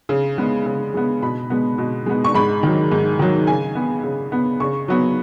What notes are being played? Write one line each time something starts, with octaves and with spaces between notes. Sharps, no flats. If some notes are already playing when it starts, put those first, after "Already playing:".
C#3
G#3 B3
C#3
G#3 B3
B2 B5
G#3 B3
B2
G#3 B3
C#6
G#2 B5
D#3 F#3
G#2
D#3 F#3
C#3 G#5
B3
C#3
B3
C#3 C#6
F#3 B3